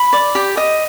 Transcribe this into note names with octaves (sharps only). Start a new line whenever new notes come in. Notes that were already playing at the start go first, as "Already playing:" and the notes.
Already playing: B5
D5
G4
D#5